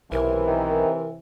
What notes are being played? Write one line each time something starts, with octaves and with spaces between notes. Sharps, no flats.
B1 C3 E3 A#4
D#3